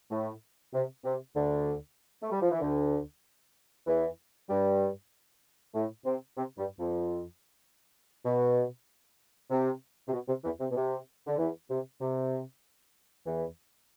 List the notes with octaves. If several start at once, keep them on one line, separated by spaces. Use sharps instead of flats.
A2 A3
C3
C3
D2 D3
A3
G3
F3
E3
D2 D3
E2 E3
G2 G3
A2 A3
C3 C4
C3 C4
G2 G3
F2 F3
B2
C3
C3
B2
C3
E2 E3
C3
B2
C3
D3
E2 E3
C3
C3
E2 E3